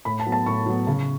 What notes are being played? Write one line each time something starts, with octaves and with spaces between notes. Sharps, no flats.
A2 B5
A5
F#3 B3
A5
A2 C#6
F#3 B3
C#3